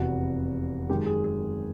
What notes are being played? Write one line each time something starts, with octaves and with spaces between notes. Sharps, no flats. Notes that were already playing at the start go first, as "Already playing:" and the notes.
Already playing: F1 E2 C3 F#4
F#2 D#3 G#3 G4
G#4
G#4